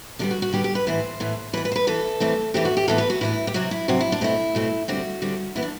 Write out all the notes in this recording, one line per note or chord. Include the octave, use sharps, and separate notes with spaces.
D3 G3 B3 D4
F#4
F#4
D3 G3 B3 G4
G4
B4
A2 E3 B3 C5
A2 E3 B3
E3 B3 B4
B4
C5
B4
E3 B3 A4
E3 A3 C4
E3 A3 C4 G4
F#4
G4
A2 E3 B3 A4
B4
F#4
A2 E3 B3 E4
G4
C3 F#3 C4 F#4
E4
C3 F#3 C4 F#4
E4
D4
B2 A3 C4 E4
B2 A3 C4
D3 G3 C4 F#4
D3 G3 C4
E3 B3 E4
D4